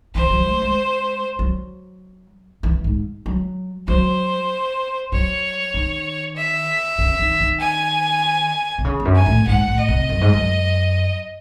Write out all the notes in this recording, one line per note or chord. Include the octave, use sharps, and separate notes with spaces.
E3 C5
F#3
A3
G#3
F#3
E3
G#2
F#3
F#3 C5
F#3 C#5
D#3
E5
C#3
D#3
D#3
G#5
C3
C#3
E2
F#2
G#5
A2
G#2 F#5
A2
D#5
C3
F#2
G#2
F#2